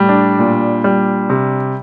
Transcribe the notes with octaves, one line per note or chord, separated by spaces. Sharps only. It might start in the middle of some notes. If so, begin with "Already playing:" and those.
Already playing: A2 G3
D4
A#2
G3
C3